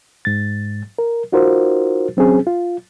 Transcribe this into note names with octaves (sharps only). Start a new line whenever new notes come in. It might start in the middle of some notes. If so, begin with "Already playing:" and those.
G#2 A6
A#4
D#4 F4 F#4 A#4 C5
F#3 C4 C#4 G#4
F4